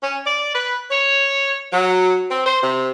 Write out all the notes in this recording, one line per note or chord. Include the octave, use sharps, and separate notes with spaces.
C#4
D5
B4
C#5
F#3
C4
C5
C3